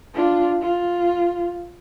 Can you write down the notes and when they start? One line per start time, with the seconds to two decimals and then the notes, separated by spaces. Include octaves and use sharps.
0.14 D4 F4
0.61 F4